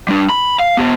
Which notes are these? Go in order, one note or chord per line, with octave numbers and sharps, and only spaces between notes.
G3 D4
B5
F5
B3 G4